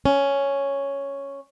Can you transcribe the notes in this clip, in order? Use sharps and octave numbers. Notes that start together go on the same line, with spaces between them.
C#4